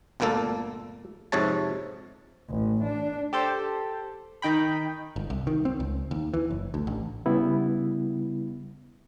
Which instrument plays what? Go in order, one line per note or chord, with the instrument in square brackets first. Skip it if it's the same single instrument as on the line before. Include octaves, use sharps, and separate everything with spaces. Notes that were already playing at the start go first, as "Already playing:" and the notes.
[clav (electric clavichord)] G1 D2 A#2 A#3 A4
F2 G#2 C3 C#5 A5
[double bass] A1
D4
[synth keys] G4 A4 C5
D#3 D#4 G5 B5
[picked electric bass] G1
C2
D#3
C4
C#2
D#2
E3
F#1
D2
A1
[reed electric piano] C#3 G3 B3 E4